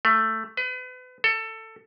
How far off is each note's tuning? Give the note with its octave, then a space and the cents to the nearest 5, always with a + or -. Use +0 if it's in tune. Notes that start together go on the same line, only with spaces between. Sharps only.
A3 +10
B4 +35
A4 +20